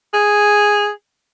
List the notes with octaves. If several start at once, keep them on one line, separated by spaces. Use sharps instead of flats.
G#4